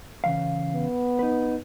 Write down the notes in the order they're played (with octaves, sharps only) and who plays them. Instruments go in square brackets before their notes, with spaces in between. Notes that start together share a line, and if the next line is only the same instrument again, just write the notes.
[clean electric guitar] C#3 E3 F5
[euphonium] B3
[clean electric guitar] D#4 B4